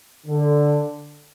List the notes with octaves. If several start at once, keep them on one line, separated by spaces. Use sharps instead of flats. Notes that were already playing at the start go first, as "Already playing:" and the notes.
D3